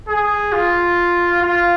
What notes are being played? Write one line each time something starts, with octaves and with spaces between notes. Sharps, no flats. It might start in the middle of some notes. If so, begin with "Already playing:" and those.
G#4
F4
F4